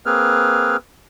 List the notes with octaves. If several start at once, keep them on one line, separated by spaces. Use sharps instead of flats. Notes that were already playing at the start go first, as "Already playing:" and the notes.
A#3 C4 G#4 B4 F6